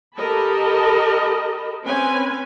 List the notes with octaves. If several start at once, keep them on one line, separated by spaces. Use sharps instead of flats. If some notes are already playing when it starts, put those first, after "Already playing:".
G4 A4 A#4 D#5 A5 B5
C4 C#4 B4 G#5